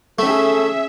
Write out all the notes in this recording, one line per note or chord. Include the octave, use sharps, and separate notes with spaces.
A3 C#4 G#4 A4 E5